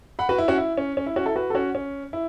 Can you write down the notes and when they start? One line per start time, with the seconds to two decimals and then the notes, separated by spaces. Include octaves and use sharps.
0.19 F#5 B5
0.29 F#4 B4
0.38 E4
0.48 C#4 F#4
0.58 E4
0.77 C#4
0.97 C#4
1.06 E4
1.16 C#4 F#4
1.26 E4 A4
1.36 F#4 B4
1.50 A4
1.55 C#4 F#4
1.75 C#4
2.13 E4